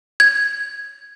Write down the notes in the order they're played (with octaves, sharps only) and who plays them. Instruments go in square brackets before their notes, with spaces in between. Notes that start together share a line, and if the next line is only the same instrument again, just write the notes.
[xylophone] G#6